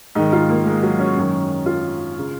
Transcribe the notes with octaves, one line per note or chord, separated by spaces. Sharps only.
G#2 D#3 D#4
F4
A#3
G#3
F#3
C#4
F#2 D#3
F4
C#3